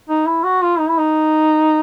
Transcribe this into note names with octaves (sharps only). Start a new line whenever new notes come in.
D#4
E4
F#4
F4
D#4
E4
D#4